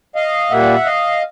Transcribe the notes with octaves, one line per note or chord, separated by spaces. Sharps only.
D#5 F5
A#2 G3 A#3 E5 F#5
D#5 F5